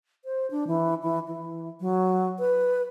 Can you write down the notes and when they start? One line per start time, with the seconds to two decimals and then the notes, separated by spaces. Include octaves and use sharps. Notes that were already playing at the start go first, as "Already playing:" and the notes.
0.25 C5
0.51 D4
0.67 E3
1.03 E3
1.27 E3
1.80 F#3
2.39 B4